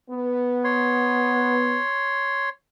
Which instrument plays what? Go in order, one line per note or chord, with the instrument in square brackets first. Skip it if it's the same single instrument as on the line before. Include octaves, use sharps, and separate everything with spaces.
[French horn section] B3
[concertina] C#5 C6